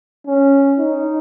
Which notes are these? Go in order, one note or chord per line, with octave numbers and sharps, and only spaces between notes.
C#4
D#4